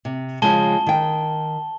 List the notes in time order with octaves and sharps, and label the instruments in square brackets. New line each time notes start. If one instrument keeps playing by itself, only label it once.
[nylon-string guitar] C3
[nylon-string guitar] C#3 F3 G#3 [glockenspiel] A5 G7
[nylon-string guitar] D#3 G5